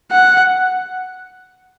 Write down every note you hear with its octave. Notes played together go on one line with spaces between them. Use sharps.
F#5